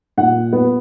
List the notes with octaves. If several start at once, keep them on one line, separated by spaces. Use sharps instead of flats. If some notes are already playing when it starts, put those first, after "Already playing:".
A#2 F#5
B3